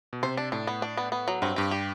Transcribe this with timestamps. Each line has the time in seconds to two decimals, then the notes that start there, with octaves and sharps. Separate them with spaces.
0.13 B2
0.23 C3 C5
0.37 D4
0.52 A2 D4
0.67 B3
0.82 D4
0.97 B3
1.12 B3
1.28 F#3
1.42 G2 C4
1.56 G2 G4
1.71 G4